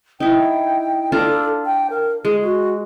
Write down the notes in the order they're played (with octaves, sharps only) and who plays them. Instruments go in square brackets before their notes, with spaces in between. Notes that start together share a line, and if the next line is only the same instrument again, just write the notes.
[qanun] D#4 E4 [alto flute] G5
[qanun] D4 F4 A#5 [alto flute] A4
[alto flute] G5
A#4
[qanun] G#3 [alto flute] G#4
[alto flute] F#4